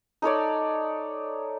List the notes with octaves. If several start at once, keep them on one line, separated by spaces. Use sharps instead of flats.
D#4 A4 C#5 D5